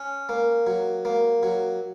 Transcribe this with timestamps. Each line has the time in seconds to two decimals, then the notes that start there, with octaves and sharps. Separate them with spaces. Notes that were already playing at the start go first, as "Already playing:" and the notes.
Already playing: C#4
0.29 A#3
0.67 F#3
1.05 A#3
1.43 F#3